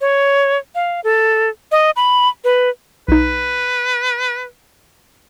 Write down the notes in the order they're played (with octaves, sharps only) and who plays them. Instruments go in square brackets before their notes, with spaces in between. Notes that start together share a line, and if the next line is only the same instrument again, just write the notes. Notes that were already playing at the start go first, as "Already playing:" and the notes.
[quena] C#5
F5
A4
D#5
B5
B4
[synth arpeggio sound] B1 D#4 [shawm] B4